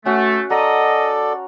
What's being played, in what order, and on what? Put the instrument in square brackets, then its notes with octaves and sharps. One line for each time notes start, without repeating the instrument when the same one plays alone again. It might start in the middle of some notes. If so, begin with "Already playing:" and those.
[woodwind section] A3 [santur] C#4 F#4
[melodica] A4 D5 [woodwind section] D#5 [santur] F#5 A#5